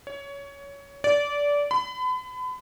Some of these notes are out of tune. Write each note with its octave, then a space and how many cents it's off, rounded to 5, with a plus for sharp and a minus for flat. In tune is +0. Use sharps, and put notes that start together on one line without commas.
C#5 +20
D5 -20
B5 +35